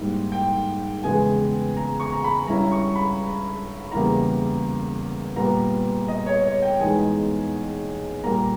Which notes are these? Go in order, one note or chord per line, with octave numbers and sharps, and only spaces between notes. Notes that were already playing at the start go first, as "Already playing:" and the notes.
Already playing: G#2 D#3 G3 A#3 E4
G5
E2 C#3 G#3 B3 E4 G#5
A#5
C#6
A#5
B5
G2 G3 C#4 E4 A#5
C#6
B5
E2 C#3 G3 A#3 E4 A#5
A#2 G3 B3 A#5
D#5
C#5
C#5
G5
E2 B2 G#3 D#4 G#5
A#2 G3 A#3 A#5